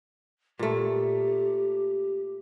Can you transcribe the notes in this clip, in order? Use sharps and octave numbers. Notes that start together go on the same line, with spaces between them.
A#2 A3 G4